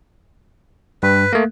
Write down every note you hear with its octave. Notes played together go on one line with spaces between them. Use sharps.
G2 B4
A3 A#3